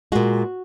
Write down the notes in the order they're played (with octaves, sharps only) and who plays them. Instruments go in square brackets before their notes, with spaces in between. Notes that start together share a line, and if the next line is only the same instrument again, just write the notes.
[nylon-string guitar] A#2 G#3 F#4